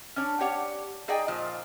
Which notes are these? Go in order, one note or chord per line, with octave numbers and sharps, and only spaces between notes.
C#4 D4 C#5
G4 C#5 D5 F#5
D#4 G#4 D5 D#5 G5 G#5
A#2 F3